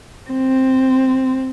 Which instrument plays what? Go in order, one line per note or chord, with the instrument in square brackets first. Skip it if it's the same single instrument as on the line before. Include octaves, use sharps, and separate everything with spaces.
[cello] C4